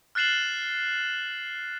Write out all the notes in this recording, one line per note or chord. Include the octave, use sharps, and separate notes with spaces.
F6 F#6 A6 C7 E7 F#7